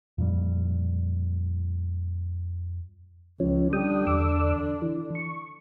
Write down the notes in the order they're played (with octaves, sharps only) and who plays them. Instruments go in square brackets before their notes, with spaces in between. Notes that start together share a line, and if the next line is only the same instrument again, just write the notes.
[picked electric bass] F2 A#2 G3
[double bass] C#2 [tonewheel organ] F3 C#4
[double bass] D3 D4 [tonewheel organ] G3 G5 D#6
[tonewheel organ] E2 D6 E6
E3
C#6